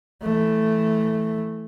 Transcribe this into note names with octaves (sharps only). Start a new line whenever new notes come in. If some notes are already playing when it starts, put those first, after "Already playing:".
E3 A3